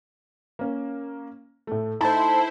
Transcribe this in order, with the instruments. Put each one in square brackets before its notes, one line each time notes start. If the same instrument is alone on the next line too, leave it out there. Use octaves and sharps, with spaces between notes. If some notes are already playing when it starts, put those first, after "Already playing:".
[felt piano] A#3 C#4
A2 A3
[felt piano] A3 D#4 [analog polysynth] E4 C5 [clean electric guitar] A5